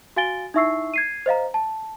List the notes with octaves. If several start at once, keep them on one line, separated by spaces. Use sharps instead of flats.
F#4 F5 G#5 A6 D7 G7
D#4 E4 E5 C#6 E6 C7
G#6 C7 D#7
C5 D#5 F5 A#5
A5